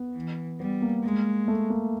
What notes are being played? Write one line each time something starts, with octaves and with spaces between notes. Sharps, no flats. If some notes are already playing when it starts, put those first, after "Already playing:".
Already playing: B3
E3
G3 B3
A#3
G#3
A3
A#3